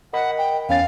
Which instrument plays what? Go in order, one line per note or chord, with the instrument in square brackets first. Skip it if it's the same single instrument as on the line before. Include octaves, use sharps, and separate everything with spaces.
[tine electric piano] A#4 D#5 B5 [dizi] F#5
[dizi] G5
[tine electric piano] E2 C#4 A6 [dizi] F5